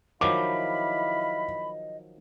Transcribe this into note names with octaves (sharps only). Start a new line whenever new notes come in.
D#3 F3 F#3 E4 D#5 F5 B5 D6